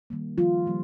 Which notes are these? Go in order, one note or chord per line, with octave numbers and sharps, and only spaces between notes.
D#3 G3 A#3
D#3 F3 G3 A#3 F4
D#3 G3 A#3